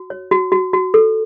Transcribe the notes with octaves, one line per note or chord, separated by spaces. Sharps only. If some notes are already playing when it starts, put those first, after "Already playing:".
Already playing: F#4
C#5
F#4
F#4
F#4
A4